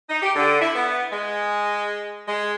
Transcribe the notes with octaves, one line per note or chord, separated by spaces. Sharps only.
D#4
G4
D3
E4
B3
G#3
G#3